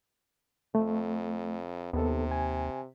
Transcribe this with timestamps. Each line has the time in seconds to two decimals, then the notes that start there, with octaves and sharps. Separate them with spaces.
0.75 F2 A3
1.93 D#2 C3 B3 A4
2.31 G#5